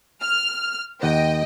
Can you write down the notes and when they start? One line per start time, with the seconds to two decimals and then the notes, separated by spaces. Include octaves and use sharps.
0.21 F6
1.03 D#2 D#5 F#5 G5